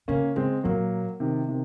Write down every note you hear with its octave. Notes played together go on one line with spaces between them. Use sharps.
C#3 A#3 C#4
C#3 G#3 C4
A#2 F#3 A#3
C3 D#3
C3 D#3